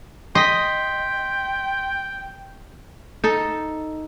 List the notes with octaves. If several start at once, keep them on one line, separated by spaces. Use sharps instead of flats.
D#5 G5 C6 B6
D#4 A4